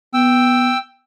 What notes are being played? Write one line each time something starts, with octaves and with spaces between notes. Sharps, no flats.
B3 G5 E6